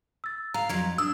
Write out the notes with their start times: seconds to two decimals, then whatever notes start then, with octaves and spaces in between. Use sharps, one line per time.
0.24 E6 A6
0.54 F5 A#5
0.69 F2 F#3 G#6
0.98 D4 D#6 E6